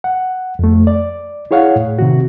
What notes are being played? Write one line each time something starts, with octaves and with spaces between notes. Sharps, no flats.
F#5
F2 A3
D5
E4 G#4 C#5 F5 F#5
A2
C3 D#3 F#4